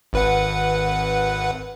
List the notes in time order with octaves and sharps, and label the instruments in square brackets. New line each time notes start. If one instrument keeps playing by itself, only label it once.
[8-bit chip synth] G#1 B4 F#5